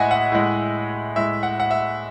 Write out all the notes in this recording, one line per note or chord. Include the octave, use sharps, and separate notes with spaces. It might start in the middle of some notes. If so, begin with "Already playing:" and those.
Already playing: A2 G#3 D#5 E5 F#5 G#5
F#5
A2 G#3
A2 G#3 E5
F#5
F#5
E5